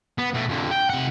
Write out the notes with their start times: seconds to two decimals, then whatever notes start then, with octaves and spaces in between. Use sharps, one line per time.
0.18 B3
0.34 B2 A3
0.49 F2 D3
0.71 G5
0.90 C3 F#5